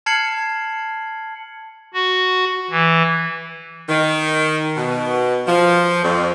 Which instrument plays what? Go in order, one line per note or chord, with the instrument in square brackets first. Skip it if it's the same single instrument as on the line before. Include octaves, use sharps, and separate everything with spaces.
[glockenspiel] A5 F6 G#6 C7 C#7 F#7
[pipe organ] F#4
E3
[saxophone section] D#3
B2
F3
F2